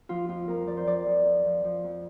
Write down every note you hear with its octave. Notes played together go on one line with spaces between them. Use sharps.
F3 F4
F2 F4
F2 A#4
F3 D5
C5
F3 D5
F2
F2
F3
F3
F2